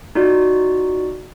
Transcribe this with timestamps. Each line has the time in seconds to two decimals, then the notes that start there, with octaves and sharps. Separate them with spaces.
0.15 D#4 F4 F#4 D5